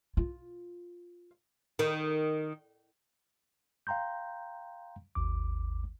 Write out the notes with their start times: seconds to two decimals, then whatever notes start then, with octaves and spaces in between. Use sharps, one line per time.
0.17 F4
1.79 D#3
3.87 F5 G5 A#5 C6 G6
5.15 G#1 D#2 D6